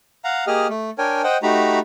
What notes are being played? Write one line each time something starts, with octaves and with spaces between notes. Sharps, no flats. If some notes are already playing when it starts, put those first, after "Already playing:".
F5 F#5 A#5
A#3 G4 G#4 D#5 F6
A3
D4 A#4 C#5 G5 G#5
C5 D#5 F#5 G5
A3 D#4 F#4 G4 A#5 B5